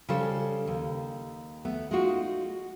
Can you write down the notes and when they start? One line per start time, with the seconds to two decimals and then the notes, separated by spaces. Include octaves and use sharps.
0.09 C#3 G3 A4 C5
0.67 D#2
1.65 A3 B3
1.91 G#3 D#4 F4 F#4